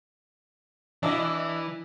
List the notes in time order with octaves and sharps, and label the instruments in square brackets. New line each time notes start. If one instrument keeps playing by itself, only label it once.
[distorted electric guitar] E3 [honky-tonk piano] D4 E4 D#5